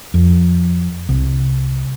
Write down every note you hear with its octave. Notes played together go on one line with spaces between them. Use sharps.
F2
C2